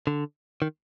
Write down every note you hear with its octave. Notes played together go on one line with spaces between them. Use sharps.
D3
D#3